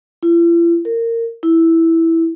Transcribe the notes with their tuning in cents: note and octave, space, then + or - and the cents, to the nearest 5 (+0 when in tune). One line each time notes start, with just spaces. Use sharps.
E4 +45
A#4 -20
E4 -5